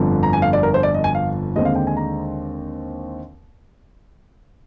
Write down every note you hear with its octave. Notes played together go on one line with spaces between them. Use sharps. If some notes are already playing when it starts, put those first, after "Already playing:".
Already playing: G1 F2 D3
A#5
G#5
F5
D5
A#4
C5
D5
D#5
G#5
F5
D#2 D3 G#3 C4 D#5
F5
G5
G#5
A#5